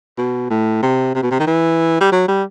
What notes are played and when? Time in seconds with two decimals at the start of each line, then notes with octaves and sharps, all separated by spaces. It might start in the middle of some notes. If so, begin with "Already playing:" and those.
0.18 B2
0.50 A2
0.83 C3
1.15 C3
1.23 B2
1.31 C3
1.39 D#3
1.47 E3
2.01 G3
2.12 F#3
2.28 G3